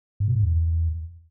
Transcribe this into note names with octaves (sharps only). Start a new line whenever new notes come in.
G2
B2
G#2
E2